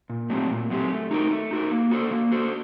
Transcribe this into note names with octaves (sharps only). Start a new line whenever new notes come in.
A#2
F#3 A3 C4 G4
A#2
F#3 A3 C4 G4
A3
D#4 F#4 A#4
A3
D#4 F#4 A#4
A#3
F#4 A4 C5
A#3
F#4 A4 C5